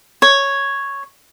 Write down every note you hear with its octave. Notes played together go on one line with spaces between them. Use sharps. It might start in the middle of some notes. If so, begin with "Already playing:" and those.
C#5